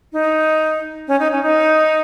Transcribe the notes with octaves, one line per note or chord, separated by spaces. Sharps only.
D#4
C#4
D#4
C#4
D#4